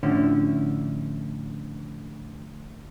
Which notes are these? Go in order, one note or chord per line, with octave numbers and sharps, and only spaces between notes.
A2 D3 F3 C#4 E4